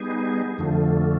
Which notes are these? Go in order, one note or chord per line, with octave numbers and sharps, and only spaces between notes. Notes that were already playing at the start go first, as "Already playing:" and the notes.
Already playing: G3 B3 D#4 G#4
F2 D3 F3 A3